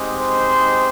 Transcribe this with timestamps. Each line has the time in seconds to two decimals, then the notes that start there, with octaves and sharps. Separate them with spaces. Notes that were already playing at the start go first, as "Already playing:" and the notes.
Already playing: G#3 C4 D#4 G4
0.20 C5